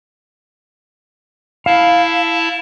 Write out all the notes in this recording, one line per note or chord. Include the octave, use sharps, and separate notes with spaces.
E4 F5 A5